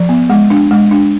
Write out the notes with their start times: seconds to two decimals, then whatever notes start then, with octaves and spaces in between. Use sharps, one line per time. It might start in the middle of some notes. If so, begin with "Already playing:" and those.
Already playing: F3
0.09 B3
0.30 G#3
0.50 D4
0.71 G#3
0.91 D4